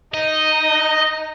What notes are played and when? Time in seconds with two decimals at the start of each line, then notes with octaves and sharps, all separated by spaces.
0.14 D#4 D#5